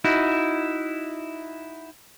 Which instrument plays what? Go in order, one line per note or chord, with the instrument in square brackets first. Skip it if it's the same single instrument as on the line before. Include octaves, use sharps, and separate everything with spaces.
[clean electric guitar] D#4 E4 F#4